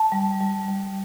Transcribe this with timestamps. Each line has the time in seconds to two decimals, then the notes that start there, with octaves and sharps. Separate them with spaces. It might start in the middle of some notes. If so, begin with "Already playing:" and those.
Already playing: A5
0.12 G3
0.41 G3
0.68 G3